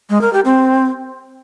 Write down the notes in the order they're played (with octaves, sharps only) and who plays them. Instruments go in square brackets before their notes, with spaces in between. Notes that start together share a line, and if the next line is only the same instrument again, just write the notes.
[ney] G#3
A#4
G4
C4